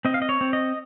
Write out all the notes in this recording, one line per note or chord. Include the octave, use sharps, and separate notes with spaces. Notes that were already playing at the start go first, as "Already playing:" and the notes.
C4 D#5
F5
D#5
C#5
C4
D#5